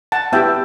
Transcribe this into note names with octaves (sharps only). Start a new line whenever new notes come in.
F#5 A5
B3 E4 G4 E5 G5